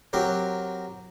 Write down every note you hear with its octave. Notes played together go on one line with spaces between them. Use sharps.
F#3 C4 F#4 G4 A#4 C5